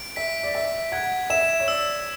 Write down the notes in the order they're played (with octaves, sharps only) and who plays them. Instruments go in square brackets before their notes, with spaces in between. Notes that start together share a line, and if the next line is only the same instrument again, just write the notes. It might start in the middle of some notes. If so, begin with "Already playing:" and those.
Already playing: [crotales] D7
[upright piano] E5 [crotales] B6
[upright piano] D5
[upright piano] E5 [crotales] B6
[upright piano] F#5 [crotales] G#6
[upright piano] E5 [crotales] E7
[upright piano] C#5
[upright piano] D5 [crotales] E6